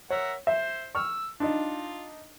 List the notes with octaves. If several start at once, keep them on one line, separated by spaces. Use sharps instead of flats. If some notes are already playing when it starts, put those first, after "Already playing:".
A#4 C#5 E5 F#5
C5 E5
C#6 E6 F6
D4 D#4 F4